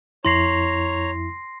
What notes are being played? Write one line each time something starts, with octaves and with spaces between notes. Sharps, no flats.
F2 E4 C#5 A#5 C6 A#6 C7